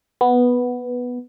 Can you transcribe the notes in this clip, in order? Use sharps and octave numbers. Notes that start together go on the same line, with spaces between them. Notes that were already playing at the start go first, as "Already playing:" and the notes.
B3